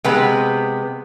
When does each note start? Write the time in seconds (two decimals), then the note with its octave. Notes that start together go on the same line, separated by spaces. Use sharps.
0.04 C3 G#3 B3